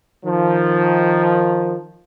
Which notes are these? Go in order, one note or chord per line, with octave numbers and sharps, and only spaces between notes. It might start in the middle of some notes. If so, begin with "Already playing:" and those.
D#3 F3